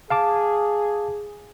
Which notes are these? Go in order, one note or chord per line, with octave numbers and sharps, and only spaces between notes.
G#4 F5 A5 D6